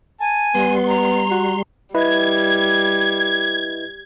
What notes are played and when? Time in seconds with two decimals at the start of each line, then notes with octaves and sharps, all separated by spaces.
0.20 G#5 A5
0.55 G3 B3 C6
0.88 A#5
1.31 F#4
1.95 G3 E4 B4 D#5 G#6